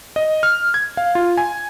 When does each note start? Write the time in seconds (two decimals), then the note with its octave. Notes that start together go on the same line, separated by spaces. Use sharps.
0.16 D#5
0.43 F6
0.74 G#6
0.97 F5
1.15 F4
1.38 G#5